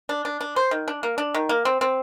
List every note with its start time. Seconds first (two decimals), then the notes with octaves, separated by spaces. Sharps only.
0.09 D4
0.25 D4
0.41 D4
0.56 C5
0.71 D#3
0.88 D4
1.03 A#3
1.18 D4
1.34 D#3
1.49 A#3
1.65 C4
1.81 C4